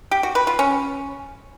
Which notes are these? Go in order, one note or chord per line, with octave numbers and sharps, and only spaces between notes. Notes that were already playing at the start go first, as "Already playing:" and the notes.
G4
F#4
B4
F4
C#4